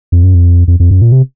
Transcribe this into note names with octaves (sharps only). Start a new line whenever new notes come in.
F2
F#2
F2
F2
F2
F#2
A#2
C3